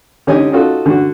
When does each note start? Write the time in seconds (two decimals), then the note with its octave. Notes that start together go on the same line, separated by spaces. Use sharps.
0.27 D3 C#4 D#4 G4 G#5
0.52 D#4 F4 F#4 A4
0.86 D3 F#4